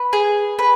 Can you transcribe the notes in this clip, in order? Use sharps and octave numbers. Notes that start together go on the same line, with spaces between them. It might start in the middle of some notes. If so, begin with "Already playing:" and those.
Already playing: B4
G#4
B4